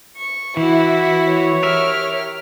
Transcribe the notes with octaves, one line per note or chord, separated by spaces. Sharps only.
C#6
E3 E4 F#4
C#5
G4 A#4 E5 F6